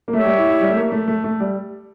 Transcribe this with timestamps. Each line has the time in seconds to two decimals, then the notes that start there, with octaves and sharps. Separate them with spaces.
0.08 A#3
0.13 A3 G4 C#5 E5
0.25 G3
0.38 E4
0.50 E4
0.61 G3
0.70 A3
0.76 A#3
0.92 A3
1.08 A3
1.24 A3
1.40 G3